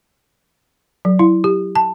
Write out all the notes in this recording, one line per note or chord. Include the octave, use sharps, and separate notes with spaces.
F#3
E4
G4
A5